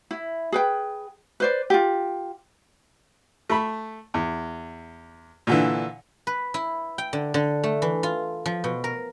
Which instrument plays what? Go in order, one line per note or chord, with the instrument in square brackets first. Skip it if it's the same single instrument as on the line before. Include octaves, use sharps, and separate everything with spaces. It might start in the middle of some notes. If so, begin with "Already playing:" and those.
[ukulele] E4
G#4 B4 G5
B4 C5 D5
F4 G4
[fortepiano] A3 B5
E2
A#2 D3 E3
[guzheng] B4
E4
G5
D3
D3
A3
E3
F4
F3
B2
A#4